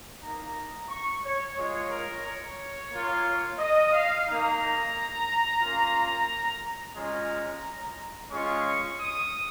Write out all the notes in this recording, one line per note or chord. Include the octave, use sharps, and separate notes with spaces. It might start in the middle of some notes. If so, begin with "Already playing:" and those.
A#3 D#4 A#5
C#6
C#5
G#3 F4 C#5
A#4
C#5
A#3 F4
D#5
F5
A#3 D#4 A#5
A#3 C#4 F4
G#3 C#4 F4 A#5
G#3 C#4 F4 C#6
D#6